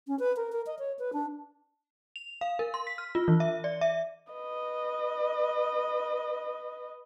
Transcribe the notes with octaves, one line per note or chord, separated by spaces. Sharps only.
C#4
B4
A#4
A#4
D#5
C#5
B4
D4
F7
F5
A#4
C6
B6
F6
F4
E3
E5
D5
E5
B4 D#5